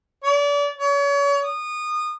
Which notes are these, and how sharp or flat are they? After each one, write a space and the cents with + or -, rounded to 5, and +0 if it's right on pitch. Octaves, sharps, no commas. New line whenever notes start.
D5 -35
C#5 +35
D#6 -25